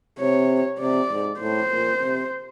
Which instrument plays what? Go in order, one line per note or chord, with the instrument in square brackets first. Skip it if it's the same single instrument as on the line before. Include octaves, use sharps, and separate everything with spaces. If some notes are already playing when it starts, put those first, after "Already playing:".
[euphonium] C3 [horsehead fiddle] C#5
[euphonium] C3 [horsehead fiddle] D5
[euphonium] G#2
[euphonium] A2 [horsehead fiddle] C5
[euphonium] A#2
C3